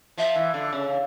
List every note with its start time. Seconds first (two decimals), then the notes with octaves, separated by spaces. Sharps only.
0.18 F3 E5
0.35 E3
0.54 D3
0.73 C#3